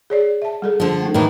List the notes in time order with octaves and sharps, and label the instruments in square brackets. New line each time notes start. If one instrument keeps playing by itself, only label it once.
[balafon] G#4 C#5 D5
E5 A5
G3 G#4 A4
[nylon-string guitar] D3 F3
[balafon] A3 D#4
[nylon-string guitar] A2 D#3 E3